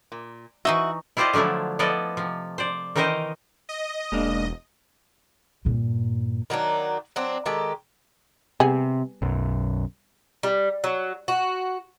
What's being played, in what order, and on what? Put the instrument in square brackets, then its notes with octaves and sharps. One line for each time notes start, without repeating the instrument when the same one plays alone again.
[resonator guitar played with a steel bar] A#2
[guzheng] E3 D#4 D#5 [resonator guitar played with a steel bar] F#4 [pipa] E5
[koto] E4 F4 G4 C5 D5 D#5
D3 F3 F#3 A3 E4
F3 B3 E4 A4 D5 D#5
C3 F3
C5 D5
D#3 E3 D#4 A#4 C5 D#5
[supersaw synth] D#5
[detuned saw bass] E1 [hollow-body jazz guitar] G#2 A#3 D4
[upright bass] G2 A#2
[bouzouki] D#3 F#3 A#3 D4
F#3 C4 D4
D#3 G#3 G4 A4
[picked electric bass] C3 [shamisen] G3 B3 G#4
[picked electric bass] B1 F#2
[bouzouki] G3
F#3
F#4